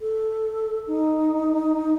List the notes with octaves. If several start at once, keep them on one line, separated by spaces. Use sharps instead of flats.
A4
D#4